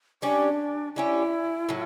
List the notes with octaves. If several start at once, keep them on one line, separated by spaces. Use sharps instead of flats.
G3 C#4 D4 G4
G3 C#4 E4 G4
A2 F#3